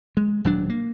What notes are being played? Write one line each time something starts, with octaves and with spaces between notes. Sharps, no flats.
G#3
D#1 F#3 D4
A#3